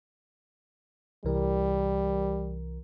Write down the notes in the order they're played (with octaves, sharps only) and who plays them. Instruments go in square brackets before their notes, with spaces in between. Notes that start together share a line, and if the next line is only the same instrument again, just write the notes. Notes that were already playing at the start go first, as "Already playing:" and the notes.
[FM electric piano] C2 E3 A#4 [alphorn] G3